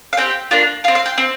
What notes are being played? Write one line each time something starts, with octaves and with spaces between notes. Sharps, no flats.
F5
C4 G4 G5
A#3 D4 F4
C4 F4 F5
F5
G5
C4